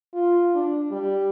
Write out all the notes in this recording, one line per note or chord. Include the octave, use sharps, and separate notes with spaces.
F4
D4
G3